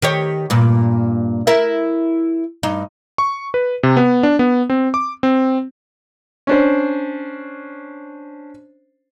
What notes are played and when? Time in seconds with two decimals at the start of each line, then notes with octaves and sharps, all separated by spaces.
0.02 D#3 G4 C#5
0.50 G2 A#2
1.47 E4 A#4 E5
2.63 G2 D#4
3.18 C#6
3.54 B4
3.83 C3
3.97 B3
4.23 D4
4.39 B3
4.70 C4
4.94 D6
5.23 C4
6.47 C#4 D4 C5